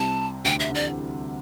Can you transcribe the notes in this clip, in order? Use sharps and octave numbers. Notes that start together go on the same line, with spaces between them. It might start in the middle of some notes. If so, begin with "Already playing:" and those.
Already playing: C2 C3 A5
D2 D3 G5
E5
D3
E3 D5